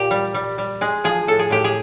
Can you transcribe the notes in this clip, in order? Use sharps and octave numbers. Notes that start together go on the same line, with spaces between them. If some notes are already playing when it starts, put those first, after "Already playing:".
Already playing: A#2 G4
G3
G3
G3
G#3 G#4
F3 G#4
A2 A4
G#4
A2 G4
G#4